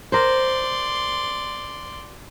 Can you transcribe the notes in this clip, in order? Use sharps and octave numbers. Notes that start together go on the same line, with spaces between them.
A#4 C5 D5 C6